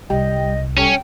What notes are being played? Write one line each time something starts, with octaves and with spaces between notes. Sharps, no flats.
C2 G3 D#5 G5
G3 C#4 A4 G5